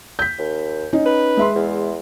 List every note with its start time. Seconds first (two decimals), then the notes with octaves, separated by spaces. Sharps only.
0.19 G6 B6
0.38 D#2
0.93 C#4 D#4
1.06 B4
1.37 G#3 E5 C6
1.55 E2